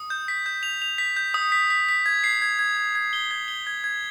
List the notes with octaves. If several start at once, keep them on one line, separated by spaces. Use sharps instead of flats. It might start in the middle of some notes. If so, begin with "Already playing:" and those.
Already playing: D#6
G6
B6
G6
F7
F7
B6
G6
D#6
B6
B6
B6
G#6
C7
G#6
G#6
G#6
G#6
G7
G#6
G7
G#6
G#6